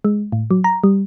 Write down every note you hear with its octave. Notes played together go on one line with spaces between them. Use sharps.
G#3
A2
F#3
A#5
G3